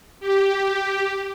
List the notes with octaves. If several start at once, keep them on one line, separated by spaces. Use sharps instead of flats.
G4